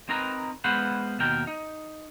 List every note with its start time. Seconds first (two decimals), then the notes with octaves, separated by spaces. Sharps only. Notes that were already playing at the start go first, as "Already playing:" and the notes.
0.09 C4 D#4 A#4 B4 A#5
0.64 G#3 B3 B4 C5 F5 F#5
1.19 D#2 B2 A#4 G5
1.47 D#4